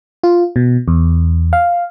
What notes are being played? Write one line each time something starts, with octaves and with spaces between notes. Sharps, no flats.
F4
B2
E2
F5